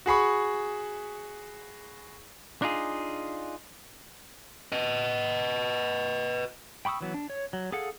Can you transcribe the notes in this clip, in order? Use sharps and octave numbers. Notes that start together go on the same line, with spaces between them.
F#4 G#4 B5 C#6
D4 D#4 F4 G#4
B4 D#5
G5 B5 C#6 D#6 E6
E3 F#3 B3
D4
C#5
F#3
G#4 A4 F5 F#5